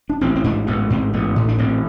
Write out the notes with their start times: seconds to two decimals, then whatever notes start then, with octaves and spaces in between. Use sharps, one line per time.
0.09 D4
0.21 A1 C4
0.36 C4
0.44 G#2 D4
0.67 A1 B3
0.90 G#2 C4
1.13 A1 B3
1.36 A2
1.48 D4
1.58 A1 C4